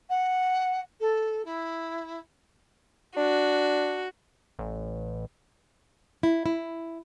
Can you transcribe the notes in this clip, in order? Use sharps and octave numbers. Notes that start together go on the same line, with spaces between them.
F#5
A4
E4
D4 F#4
A1
E4
E4